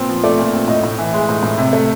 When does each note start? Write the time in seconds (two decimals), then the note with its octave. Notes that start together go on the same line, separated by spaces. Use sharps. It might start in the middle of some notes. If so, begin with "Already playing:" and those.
Already playing: A#2 B3 C4
0.08 F3
0.24 A3 D5
0.39 A#2
0.53 C4
0.68 A2 D#5
0.83 A2
0.99 E3
1.13 G#3
1.29 A2
1.43 A2
1.58 C3
1.73 A3